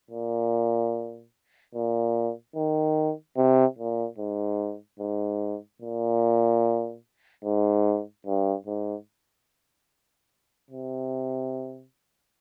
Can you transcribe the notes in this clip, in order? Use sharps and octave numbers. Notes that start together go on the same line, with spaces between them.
A#2
A#2
D#3
C3
A#2
G#2
G#2
A#2
G#2
G2
G#2
C3